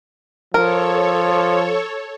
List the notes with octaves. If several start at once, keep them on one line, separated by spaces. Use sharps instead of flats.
F3 A4 A#4 C#5